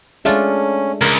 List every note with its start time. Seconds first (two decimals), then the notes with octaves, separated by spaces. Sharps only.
0.25 G#3 A3 C#4 D4 F4 G#4
1.01 C#2 A#4